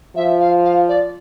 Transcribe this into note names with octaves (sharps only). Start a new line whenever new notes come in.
F3 E5
F5
F5
D5